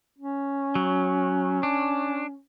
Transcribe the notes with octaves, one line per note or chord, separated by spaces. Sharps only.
C#4
F#3
D4